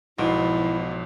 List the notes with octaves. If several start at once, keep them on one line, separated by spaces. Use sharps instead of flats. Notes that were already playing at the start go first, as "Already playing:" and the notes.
B1 G#2 B2 F3 E4